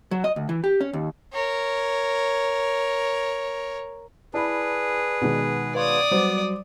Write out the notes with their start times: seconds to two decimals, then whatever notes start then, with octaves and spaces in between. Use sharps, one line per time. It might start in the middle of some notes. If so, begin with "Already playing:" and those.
0.11 F#3
0.24 D#5
0.36 D2
0.49 E3
0.64 G4
0.81 C#4
0.93 D#2
1.33 A#4 C#5
4.34 E4 G#4 B4 D5 A5 B5
5.22 B2 D#3 G#3
5.75 B4 C#5 D5 F5 C6 D#6
6.11 F#3 G3 B3 C5 D6